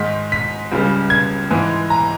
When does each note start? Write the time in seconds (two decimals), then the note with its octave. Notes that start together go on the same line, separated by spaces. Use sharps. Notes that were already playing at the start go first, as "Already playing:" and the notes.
Already playing: G#2 D#3 G#3 B6
0.32 B6
0.72 C#2 C#3 G3
1.10 G#6
1.50 G#2 E3 G#3
1.90 A#5